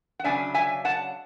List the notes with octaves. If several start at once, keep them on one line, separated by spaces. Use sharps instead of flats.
F#5
C#3 F#3 B3 D4 E5 G#5
E5 G#5
F#5 A5